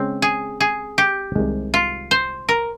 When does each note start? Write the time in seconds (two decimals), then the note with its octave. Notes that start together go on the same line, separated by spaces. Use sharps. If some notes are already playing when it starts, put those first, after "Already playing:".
Already playing: C#3 G#3 C4 C#4
0.22 G#4
0.60 G#4
0.98 G4
1.35 C2 C3 D#3 G#3
1.74 F4
2.11 C5
2.49 A#4